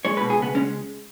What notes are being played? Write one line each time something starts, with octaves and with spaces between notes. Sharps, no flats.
G#3 C#5
B4
B2
G#4
C#2 B3
G#3 C#4